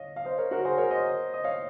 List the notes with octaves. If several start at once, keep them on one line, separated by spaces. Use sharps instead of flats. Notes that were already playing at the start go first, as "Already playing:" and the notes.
Already playing: C#5 D#5 F5
F5
C5 D#5
A#4 C#5
F#4 A#4
G#4 C5
A#4 C#5
C5 D#5
D#5
C#5 F5